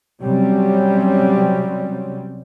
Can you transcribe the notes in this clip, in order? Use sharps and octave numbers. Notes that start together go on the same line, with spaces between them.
C3 F#3 G3 C4 C#4